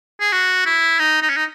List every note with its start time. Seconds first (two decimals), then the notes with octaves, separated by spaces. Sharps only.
0.21 G#4
0.32 F#4
0.66 E4
0.99 D#4
1.22 D#4
1.29 C#4
1.37 D#4